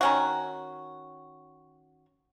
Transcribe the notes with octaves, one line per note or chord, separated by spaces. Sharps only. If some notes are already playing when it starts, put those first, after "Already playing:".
D#3 C#4 F#4